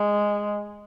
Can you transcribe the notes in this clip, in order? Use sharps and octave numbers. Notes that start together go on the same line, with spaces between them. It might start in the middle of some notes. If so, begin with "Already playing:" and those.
Already playing: G#3